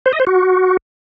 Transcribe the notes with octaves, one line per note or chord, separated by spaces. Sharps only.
C5
D#5
C5
F#4